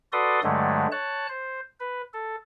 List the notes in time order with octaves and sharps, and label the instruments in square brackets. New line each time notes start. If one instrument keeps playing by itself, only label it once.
[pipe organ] F#4 A4 B4 D5 C6 D#6
G2 D3 F#3 G#3 A3
C#5 A5 F#6
C5
B4
A4